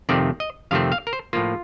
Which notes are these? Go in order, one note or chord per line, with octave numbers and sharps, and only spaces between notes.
F2 C3 D#3 A3 C4 D5
D#5
F2 C3 D#3 A3 C4 F5
F5
A#4
C5
A2 F3 A#3 F4